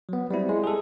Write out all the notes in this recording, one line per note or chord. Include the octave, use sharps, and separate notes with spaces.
F#3 B3
G3 C4 E4
G#3
G#4 A4